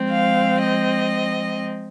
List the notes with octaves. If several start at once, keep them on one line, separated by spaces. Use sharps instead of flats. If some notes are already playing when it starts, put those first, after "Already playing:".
Already playing: F3 G#3 C4
F5
D#5